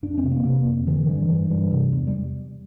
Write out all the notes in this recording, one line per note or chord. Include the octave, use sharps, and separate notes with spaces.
F2 D4
C4
C3
A#3
C3 A#3
F2
D3 E3
G2 E3
G2 E3
G2
C3
E2
G3